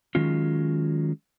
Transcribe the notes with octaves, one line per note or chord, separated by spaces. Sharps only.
D#3 F#3 G#3 C#4 F4